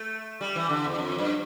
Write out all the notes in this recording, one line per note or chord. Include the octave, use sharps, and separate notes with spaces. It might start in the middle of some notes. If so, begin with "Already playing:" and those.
Already playing: A3
G3
E3
D3
E2
F2
G2